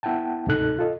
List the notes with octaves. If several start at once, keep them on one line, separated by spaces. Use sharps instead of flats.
B3 E4 F#5 G5 A5
D2 G#2 C3 D#4 A4 F#6
F4 A4 D#5